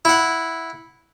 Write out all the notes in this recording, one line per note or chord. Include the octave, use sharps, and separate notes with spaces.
E4 F#5